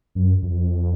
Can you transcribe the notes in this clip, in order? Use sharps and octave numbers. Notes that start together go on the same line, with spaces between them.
F#2
F2